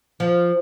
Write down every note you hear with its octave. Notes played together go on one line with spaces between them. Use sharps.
F3